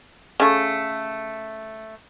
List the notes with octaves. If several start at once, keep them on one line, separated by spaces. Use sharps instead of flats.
C#3 A3